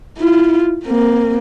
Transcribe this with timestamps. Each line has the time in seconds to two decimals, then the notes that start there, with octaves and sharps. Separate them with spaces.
0.18 E4 F4
0.85 A#3 C4